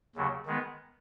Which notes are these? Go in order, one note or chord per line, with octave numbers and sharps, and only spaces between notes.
D#2 C#3 F#3
D#3 G#3 B3